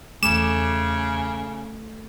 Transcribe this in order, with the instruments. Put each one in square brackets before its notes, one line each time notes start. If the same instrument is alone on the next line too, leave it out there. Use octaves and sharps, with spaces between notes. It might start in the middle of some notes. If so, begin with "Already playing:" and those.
[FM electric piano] E2 D6 [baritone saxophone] C#3 [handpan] A3 [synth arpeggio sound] E7